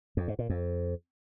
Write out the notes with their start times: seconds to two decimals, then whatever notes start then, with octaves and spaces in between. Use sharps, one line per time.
0.17 F2
0.28 G#2
0.39 A#2
0.50 F2